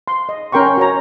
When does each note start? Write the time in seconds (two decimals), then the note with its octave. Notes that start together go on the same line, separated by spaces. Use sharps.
0.08 C6
0.29 D#5
0.52 C#4 A#4 G5 C6 C#6
0.77 F#4 C#5 A#5